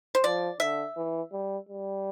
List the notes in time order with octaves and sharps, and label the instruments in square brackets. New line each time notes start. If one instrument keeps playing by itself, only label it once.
[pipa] C5
[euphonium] F3 [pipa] D5
[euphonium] D3 [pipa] E5
[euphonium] E3
G3
G3